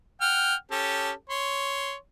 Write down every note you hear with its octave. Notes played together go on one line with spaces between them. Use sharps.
F#5 G5 F6
C#4 G4 A4
C#5 C6